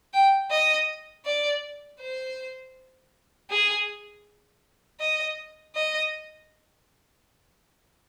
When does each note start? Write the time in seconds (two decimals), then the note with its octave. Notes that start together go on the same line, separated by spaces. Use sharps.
0.14 G5
0.51 D#5
1.25 D5
2.00 C5
3.50 G#4
5.00 D#5
5.75 D#5